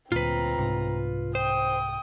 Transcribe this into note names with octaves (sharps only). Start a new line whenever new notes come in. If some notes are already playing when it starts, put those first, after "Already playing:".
D2 A#2 C4 F4 B4 A#5
C2 G#2
C5 G5 D#6